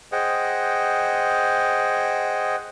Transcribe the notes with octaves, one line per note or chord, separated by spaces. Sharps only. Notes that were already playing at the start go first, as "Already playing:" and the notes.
G#4 C5 D#5 F#5 G5